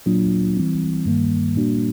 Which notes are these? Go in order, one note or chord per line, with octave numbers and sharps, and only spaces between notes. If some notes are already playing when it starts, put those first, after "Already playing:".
A#2 F#3 A#3 D4 F4
E3 G3 C4 E4
G2 D#3 G3 A#3
A#2 G3 A#3 D4 F#4